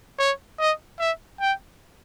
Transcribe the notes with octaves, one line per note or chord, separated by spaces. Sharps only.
C#5
D#5
E5
G5